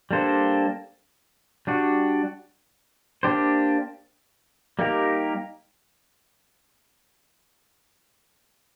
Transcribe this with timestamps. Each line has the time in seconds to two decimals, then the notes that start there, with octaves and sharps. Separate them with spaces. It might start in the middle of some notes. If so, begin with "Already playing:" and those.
0.11 G3 A#3 D4 A4 C5
1.67 G3 D4 F#4
3.23 A#3 D4 G4 C5
4.79 G3 A#3 D#4 G4 A#4